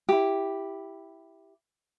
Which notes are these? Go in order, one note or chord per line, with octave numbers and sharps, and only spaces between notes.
E4 G4